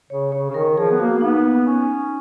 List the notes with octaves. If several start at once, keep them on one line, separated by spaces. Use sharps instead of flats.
C#3 C#5
C#3 C#5
C#3
D#3 A#4
F3 G#4
B3
A#3 F#4
A#3
B3 D#4
C#4